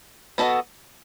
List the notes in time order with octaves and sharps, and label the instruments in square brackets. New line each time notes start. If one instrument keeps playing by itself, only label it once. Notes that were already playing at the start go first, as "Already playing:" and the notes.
[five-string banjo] B3 F#4 A4 D#5